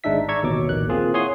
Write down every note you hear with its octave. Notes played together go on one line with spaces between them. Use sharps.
G#1 G#3 D4 D#4 E5 B6
D5 A#5 C#6 E6 G#6
A1 D#2 B2 C#5 D6
A#1 D#2 D#3 F#6
A#3 C4 F4 G#4
E4 G#4 C#5 F#5 C6 D#6